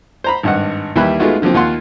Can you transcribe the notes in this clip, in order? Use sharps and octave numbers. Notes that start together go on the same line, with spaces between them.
C5 A#5 B5
G#1 G2 D#5 F#5
D#2 E3 G3 E5 B5 F#6
G#3 A3 B3 D#4 F4 F#4
D3 F3 F#3 A#3 C4
D#2 F4 F#5 C6